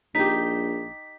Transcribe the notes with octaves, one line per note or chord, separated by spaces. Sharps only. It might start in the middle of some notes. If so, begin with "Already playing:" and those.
A#1 D#4 G4 B6